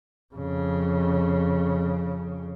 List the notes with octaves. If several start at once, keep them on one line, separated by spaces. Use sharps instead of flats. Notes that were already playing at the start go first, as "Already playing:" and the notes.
F2 C#3